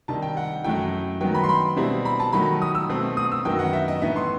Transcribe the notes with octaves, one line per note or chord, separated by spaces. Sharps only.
C3 D#3 G3 D#4 A5
G5
F#5
F#2 F#3 A3 E4 G5
D#3 F#3 B3 G5
B5
C6
B5
B2 G3 C4 E4
B5
A5
D#3 F#3 A3 B5
D#6
E6
B2 A3 C4
D#6
E6
F#2 D#3 F#3 B3 G5
F#5
E5
D#5
A2 E3 B3 D#4 E5
C6